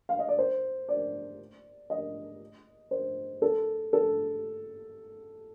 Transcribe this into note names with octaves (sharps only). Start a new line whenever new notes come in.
F5
D#5
D5
C5
D5
D#5
C5
A4
A4